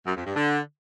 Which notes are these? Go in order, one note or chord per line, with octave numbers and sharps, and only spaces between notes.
F#2
F2
G2
D3